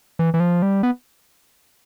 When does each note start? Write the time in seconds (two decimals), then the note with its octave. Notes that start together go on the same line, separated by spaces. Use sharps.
0.19 E3
0.34 E3
0.40 F3
0.62 G3
0.83 B3